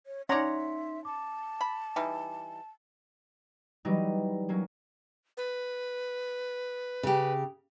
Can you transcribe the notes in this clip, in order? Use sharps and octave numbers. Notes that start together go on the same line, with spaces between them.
C#5
C#4 D#4 C#5 D5 E5 F#5 A#5 C6
A5 D6
B5
E3 G3 D#4
E3 F#3 G3 D#4
F#3 A#3 C#4
B4
C#3 G4